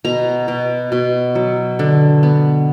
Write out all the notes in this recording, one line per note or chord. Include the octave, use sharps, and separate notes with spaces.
B2 A#5
B2
B2
F#3
D3
B3